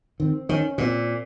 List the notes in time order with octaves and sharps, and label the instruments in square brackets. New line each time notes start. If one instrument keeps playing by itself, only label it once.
[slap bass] D#3 [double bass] C4
[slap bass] D#3 [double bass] C#4
[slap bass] A#2 [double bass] C4